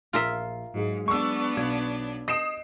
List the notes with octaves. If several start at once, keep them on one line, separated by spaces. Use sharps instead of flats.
A#1 F4 A#4 E5 C7
G#2 F#3 G#3 G#4
B3 D4 C#6 E6
B1 F5 G#6
D#5 D#6 G6 C7 D7 E7